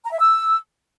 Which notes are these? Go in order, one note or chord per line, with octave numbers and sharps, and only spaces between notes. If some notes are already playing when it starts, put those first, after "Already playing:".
A#5
E5
E6